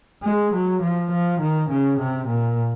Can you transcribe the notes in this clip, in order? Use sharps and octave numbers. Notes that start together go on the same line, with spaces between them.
G#3
F#3
F3
F3
D#3
C#3
C3
A#2